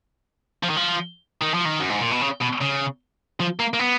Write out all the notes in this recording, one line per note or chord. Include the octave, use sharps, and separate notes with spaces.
F3
D#3
F3
D#3
F3
D#3
F#2
G#2
A#2
B2
C#3
B2
C#3
F3
A#3
A#3
B3